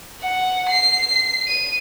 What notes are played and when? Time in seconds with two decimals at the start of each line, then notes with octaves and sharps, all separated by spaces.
0.22 F#5
0.70 C7
1.47 D#7